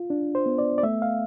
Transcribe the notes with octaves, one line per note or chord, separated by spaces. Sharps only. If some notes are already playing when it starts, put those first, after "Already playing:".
Already playing: F4
D4
C5
B3
D5
D5
A3 E5
F5